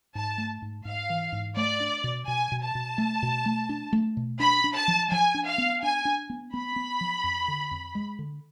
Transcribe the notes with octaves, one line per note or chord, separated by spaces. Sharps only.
G#2 A5
A3
G#2
G#2 F5
E3
G#2
A3 D5
D4
B2
B2 G#5
B2
A5
B2
A3
B2
A3
D4
A3
B2
D4 B5
D4
A5
F3
F3 G#5
D4
F5
B3
D4 G#5
D4
B3
B3 B5
B3
F3
F2
D3
F2
G#3
D3